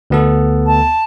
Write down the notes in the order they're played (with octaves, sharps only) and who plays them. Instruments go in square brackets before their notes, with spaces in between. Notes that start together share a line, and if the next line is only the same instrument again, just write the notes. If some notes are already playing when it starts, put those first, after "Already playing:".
[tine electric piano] D2 B3 A4
[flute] A5